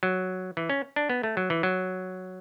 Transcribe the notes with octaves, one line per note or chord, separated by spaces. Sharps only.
F#3
E3
C#4
D4
B3
A3
F#3
E3
F#3